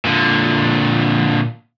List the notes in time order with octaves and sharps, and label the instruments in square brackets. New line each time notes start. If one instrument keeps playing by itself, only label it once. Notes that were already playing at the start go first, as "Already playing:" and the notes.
[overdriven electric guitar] A#2 D3